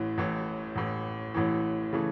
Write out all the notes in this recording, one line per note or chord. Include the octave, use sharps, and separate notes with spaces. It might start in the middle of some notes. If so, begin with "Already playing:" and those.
Already playing: A1 A2 E3
A1 A2 E3
A1 A2 E3
A1 A2 E3
C#3 E3 A3